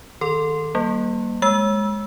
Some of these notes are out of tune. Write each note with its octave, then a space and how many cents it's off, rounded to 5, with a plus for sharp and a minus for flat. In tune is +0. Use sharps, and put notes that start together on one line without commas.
D#3 -5 A4 +15 C6 +0
G3 -25 A#3 +10
G#3 +0 E6 +0